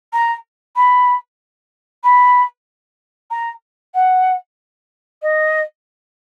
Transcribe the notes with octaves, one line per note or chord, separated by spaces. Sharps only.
A#5
B5
B5
A#5
F#5
D#5